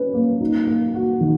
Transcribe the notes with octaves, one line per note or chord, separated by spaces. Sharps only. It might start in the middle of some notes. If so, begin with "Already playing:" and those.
Already playing: C#4 B4
A#3
D#4
A#3
F#4
D#3